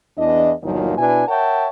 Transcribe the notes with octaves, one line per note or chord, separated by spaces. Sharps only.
E2 D4 D#5
G1 D#2 A#2 D#3 F3 F#3
B2 D4 E4 B4 G#5
A#4 C#5 E5 F#5 G5 A5